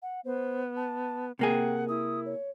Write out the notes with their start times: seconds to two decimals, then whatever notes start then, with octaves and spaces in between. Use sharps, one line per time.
0.02 F#5
0.25 B3 C5
0.77 A5
1.39 C3 A#3 G#4 F#5 G5
1.89 E4 D#6
2.26 C#5